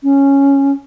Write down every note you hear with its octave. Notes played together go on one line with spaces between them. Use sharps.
C#4